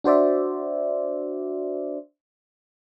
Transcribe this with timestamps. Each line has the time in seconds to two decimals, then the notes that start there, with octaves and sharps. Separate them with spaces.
0.04 D4 F#4 C5 D5 E5